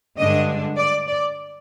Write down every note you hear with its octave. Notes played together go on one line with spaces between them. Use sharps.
G2 D3 G#3 D4 D#5
D5
D5